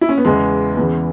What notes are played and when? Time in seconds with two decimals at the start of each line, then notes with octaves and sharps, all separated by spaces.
0.01 E4
0.09 C#4
0.18 B3
0.25 E2 C#3 E3 G#3
0.77 E2 C#3 E3 B3